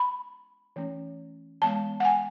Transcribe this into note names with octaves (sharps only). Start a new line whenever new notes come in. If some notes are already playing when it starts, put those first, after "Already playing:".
Already playing: B5
E3 A3 C#4
E3 G#3 B3 A5
F#5
G#5